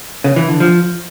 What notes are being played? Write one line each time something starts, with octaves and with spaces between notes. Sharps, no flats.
C#3
E3
D3
F3